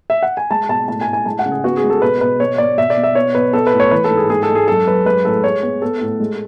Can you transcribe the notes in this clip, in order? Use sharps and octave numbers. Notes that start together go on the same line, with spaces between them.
E5
F#5
G#5
G#3 A5
B2 A5
A2 A5
G#5
A2
G#5
G#3 A5
F#5
C#3
G#4
B3 F#4
G#4
G#3
A4
B2 B4
B2 B4
B2 C#5
B2 D5
B2 E5
D5
B2
E5
B3 C#5
B2 B4
B3 A4
B4
A2
C#5
E3 B4
A4
G#2
G#4
G#2 G#4
A4
G#3
G#4
F#2 A4
F#2 B4
G#3 B4
A2 A4
G#3 C#5
B3
B3 A4
A2
G#3